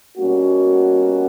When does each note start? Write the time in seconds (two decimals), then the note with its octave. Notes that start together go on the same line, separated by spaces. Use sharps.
0.18 B2 G3 A#3 C#4 F#4